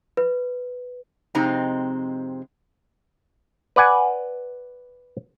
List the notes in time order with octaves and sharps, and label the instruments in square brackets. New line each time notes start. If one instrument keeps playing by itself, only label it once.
[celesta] B4
[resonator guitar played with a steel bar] F2 C3 G#3 C4 D#4 A#5
[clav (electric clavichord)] B4 D5 F#5 G#5